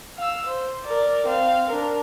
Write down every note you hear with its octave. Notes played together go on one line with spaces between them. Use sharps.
F5 E6
C5
A#4 D5
C4 F5
D4 A#4